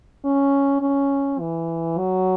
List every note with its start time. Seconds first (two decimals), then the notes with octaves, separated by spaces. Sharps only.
0.24 C#4
0.82 C#4
1.40 E3
1.98 F#3